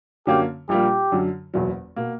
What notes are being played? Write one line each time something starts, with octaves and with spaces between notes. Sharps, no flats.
F#2 D3 F#3 A#3 C#4 G4
A#1 A#2 G3 A#3 G4
F#2 D3 F#3
F#1 E2 B2 F#3
B2 A#3